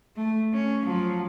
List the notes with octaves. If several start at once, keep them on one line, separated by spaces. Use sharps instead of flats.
A3
C#4
F3 F#3